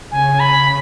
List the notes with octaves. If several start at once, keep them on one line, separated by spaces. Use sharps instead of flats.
C#3 G#5
C#3 B5